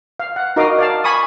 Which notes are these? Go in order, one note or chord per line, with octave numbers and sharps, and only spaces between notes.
F5
F#5
D#4 F#4 A#4 D#5 F5 D6
D5 F5 A5
G#5 B5 C#6 D#6